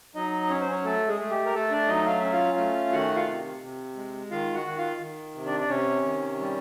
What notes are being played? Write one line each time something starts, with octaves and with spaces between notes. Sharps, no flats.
F#3 D#4 D#5
C#4 C#5
C5
C#4 C#5
A3 A4
G#3 G#4
A3 G#4
G4
A#4
A3 A4
D4 D5
F#3 D#4 D#5
F5
C#4 E5
F4 F5
A3
D#3 F#4 F#5
F4 F5
C3
C3
G#3
D#3 F4 F5
F#4 F#5
D#3 F#5
F4 F5
D#3
C3
D4 D5
D5
C3 C#4 C#5
D#3
G3